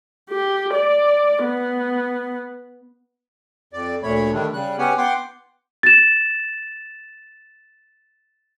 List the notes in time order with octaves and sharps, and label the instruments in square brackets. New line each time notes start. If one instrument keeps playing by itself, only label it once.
[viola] G4
D5
B3
[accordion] F2 D5
D2 A#2 A3 C#5 B5
D3 D#3 G3 A3 D4
C#3 G3 F#6
B3 C#4 G4 C#5 F#5 G#5
B3 F#5 G5 C6 D6
[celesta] A6 E7